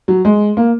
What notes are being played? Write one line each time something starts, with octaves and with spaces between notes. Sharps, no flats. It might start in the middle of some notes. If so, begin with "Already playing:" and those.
F#3
G#3
A#3